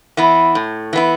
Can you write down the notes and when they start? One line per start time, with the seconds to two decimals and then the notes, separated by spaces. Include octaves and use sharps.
0.17 E3 B3 E4
0.55 A2
0.93 E3 B3 E4